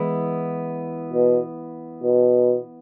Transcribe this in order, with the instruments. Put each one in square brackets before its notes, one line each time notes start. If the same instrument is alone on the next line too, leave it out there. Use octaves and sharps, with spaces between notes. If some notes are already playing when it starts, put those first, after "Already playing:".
Already playing: [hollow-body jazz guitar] E3 G#3 B3 E4
[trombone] B2
B2